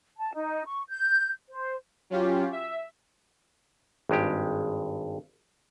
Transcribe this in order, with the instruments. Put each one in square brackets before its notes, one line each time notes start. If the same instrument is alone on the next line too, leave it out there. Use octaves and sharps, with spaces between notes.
[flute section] A5
D#4
C#6
G6
C5
[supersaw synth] F#3 C#4 F4 G4
E5
[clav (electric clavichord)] G#1 G2 G#3 G4